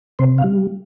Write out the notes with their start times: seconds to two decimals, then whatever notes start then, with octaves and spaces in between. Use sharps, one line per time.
0.19 C3 C5
0.38 F5
0.44 G3